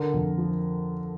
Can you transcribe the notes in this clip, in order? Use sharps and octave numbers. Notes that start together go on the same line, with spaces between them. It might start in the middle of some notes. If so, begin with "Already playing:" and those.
Already playing: D3 A#4
F2
F3